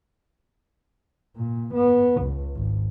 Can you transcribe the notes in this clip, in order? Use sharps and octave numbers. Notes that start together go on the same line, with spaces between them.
A#2
B3
C#2
G#1